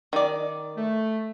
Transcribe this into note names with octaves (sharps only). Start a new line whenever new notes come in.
D#3 D5
A3